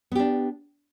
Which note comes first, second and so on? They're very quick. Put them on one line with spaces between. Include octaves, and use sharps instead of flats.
B3 G4 D4